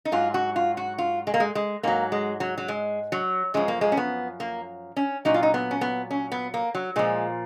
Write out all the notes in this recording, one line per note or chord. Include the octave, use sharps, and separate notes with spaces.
D#4
G#2 F#3 F4
F#4
F4
F#4
F4
G#3
A#3
G#3
G#3
G#2 F#3 A#3
G#3
F#3
F#3
G#3
F#3
F#2 F3 G#3
A#3
G#3
C#4
B3
A#3
C#4
A#2 F#3 D#4
F4
D#4
B3
C#4
B3
C#4
B3
A#3
F#3
A#2 F3 G#3